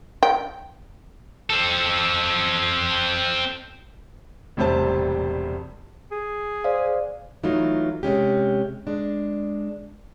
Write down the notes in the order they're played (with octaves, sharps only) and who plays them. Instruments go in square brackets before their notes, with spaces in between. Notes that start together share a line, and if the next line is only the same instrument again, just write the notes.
[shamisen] G5
[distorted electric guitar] C4 A4
[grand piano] E1 A2 C3 G3 C5 A5
[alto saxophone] G#4
[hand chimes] C5 D5 F5
[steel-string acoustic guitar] E3 F#3 A3 D#4 F4
C3 G#3 C#4 G4
G#3 D4